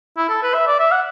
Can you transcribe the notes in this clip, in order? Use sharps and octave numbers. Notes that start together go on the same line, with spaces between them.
E4
A4
B4
E5
D5
E5
F#5